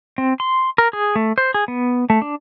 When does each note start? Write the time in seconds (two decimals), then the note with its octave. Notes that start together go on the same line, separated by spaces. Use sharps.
0.18 C4
0.40 C6
0.78 A#4
0.93 G#4
1.16 A3
1.38 C5
1.54 G#4
1.68 B3
2.10 A3
2.22 D4